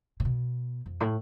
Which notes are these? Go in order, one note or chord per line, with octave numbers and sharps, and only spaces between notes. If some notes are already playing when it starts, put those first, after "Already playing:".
C3
B2
F2
A2